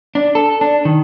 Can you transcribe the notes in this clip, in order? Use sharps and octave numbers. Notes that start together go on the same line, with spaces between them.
D4
A4
D4
D#3